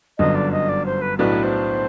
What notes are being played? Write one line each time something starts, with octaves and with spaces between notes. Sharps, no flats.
G1 F#2 D3 D#5
D5
D#5
D5
C5
B4
B1 A2 F#3 B3 D4 B4
C5